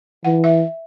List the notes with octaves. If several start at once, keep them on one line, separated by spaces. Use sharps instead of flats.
E3 F#5
E5